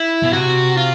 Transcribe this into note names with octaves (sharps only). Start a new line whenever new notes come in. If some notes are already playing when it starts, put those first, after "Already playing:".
Already playing: E4
B2
C3 F#4
F4